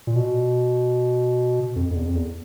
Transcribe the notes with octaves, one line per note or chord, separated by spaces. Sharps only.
A#2
B2
F2
F2
E2
F2
E2